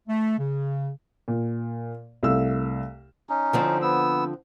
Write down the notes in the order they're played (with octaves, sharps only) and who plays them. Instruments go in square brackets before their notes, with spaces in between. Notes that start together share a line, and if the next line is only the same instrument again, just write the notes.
[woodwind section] A3
C#3
[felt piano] A#2
C2 A3 F5 E6
[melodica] C#4 D#4
[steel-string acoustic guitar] D3 F3 C4
[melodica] B3 E6